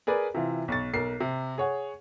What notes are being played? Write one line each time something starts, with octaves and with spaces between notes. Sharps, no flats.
G#4 A#4 B4 D5
C3 E3 F4
B1 C#6 A6
B1 A#4 C7
C3
G#4 C#5 F#5